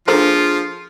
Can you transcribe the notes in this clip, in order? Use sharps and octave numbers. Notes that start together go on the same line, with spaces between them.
F3 A#3 D4 F4 G#4 A4 C5